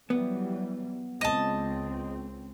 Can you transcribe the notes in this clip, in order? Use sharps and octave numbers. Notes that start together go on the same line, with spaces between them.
E3 F#3 G3 B3
C#2 C4 D#5 A5